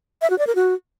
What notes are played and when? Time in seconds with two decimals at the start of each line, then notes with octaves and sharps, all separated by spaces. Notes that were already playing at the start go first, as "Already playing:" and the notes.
0.22 E5
0.30 F#4
0.38 D5
0.47 A#4
0.55 F#4